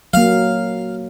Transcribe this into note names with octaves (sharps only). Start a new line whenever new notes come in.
F#3 A#3 F5